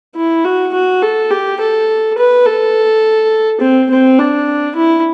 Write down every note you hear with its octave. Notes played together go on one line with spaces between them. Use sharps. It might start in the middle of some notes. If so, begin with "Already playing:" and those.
E4
F#4
F#4
A4
G4
A4
B4
A4
C4
C4
D4
E4